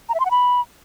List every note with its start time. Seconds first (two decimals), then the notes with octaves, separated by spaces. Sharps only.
0.09 A#5
0.14 E5
0.20 C6
0.25 F#5
0.31 B5